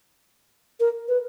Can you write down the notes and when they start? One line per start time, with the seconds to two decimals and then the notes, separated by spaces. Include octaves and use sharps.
0.80 A#4
1.08 B4